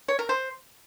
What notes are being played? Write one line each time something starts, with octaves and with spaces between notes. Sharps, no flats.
C#5
A#4
C5